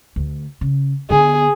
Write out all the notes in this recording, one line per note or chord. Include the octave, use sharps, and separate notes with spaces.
D2
C#3
D3 B3 G#4